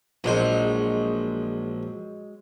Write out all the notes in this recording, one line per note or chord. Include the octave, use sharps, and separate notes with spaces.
A#1 F#3 G#3 D#4 C5